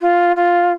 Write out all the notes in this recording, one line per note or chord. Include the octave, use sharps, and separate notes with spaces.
F4
F4